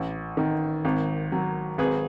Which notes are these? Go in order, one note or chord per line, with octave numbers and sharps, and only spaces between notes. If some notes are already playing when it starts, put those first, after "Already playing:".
Already playing: A1
D#3
G#1
F#3
G#1 G#4 B4